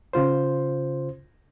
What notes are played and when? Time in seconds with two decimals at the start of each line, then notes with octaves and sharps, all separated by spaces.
0.13 C#3 F4 C5